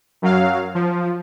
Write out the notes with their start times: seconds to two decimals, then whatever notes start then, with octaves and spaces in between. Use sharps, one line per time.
0.22 F#2 F#3 F5
0.75 F3